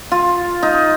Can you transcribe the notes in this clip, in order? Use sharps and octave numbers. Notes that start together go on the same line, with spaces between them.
F4
D#4